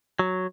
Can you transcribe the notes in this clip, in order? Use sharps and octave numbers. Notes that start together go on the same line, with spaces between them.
F#3